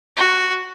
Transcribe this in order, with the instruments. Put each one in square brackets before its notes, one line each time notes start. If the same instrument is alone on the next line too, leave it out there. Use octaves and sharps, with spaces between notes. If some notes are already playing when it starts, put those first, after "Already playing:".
[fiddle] F#4